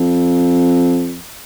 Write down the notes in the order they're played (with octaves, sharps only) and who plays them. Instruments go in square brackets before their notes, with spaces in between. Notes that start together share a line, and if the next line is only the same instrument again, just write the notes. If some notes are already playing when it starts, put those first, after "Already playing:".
Already playing: [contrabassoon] F2